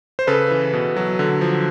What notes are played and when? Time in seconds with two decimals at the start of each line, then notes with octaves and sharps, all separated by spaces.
0.19 C5
0.27 C#3 A4 B4
0.51 E3
0.73 B2
0.96 F#3
1.19 D3
1.41 F3